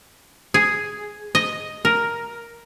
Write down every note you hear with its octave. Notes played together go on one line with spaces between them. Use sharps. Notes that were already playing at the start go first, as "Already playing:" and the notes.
G#4
D#5
A#4